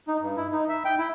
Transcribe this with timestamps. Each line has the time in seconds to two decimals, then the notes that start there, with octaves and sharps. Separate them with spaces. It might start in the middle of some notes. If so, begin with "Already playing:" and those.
0.08 D#4
0.21 G2
0.37 E4
0.52 D#4
0.69 E5
0.85 G5
0.98 E4